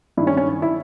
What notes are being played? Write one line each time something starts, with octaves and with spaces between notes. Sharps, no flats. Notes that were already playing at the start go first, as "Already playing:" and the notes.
G2 D#3 E4
C#4
C#4
E4